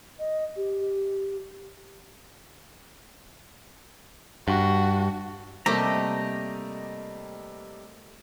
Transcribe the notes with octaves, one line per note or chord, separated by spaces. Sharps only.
D#5
G4
G2 F#4
C3 G3 A3 A#3 G4 D#5 A#5